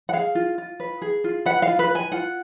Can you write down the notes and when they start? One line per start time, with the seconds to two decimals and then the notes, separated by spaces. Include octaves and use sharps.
0.09 F#5
0.13 G#4 F5
0.35 F4
0.58 F4
0.80 B4
1.02 G#4
1.24 F4
1.46 B4 F#5
1.62 F5
1.68 F4
1.79 B4
1.91 B4 G#5
2.12 F4 F#5